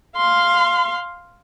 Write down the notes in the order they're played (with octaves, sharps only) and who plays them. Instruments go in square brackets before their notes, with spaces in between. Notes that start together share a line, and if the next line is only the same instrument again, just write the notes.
[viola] F5 C6